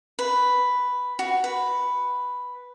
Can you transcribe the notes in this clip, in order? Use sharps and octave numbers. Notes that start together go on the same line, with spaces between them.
B4
F#4
B4